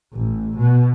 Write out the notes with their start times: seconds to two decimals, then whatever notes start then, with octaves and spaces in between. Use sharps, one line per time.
0.13 A1
0.58 B2